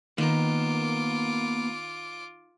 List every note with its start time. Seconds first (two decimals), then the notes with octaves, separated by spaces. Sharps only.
0.18 D#3 A#3 B3 F4 A#4 D6